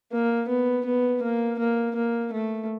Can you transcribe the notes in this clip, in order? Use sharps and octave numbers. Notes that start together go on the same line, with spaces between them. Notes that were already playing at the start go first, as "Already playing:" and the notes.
A#3
B3
B3
A#3
A#3
A#3
A3